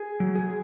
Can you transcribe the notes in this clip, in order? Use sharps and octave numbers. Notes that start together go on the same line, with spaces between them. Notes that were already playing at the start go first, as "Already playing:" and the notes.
Already playing: G#4
F#3
G#4